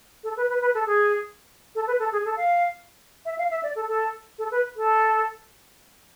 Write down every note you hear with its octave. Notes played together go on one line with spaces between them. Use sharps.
A4
B4
B4
B4
A4
G#4
A4
B4
A4
G#4
A4
F5
E5
F5
E5
D5
A4
A4
A4
B4
A4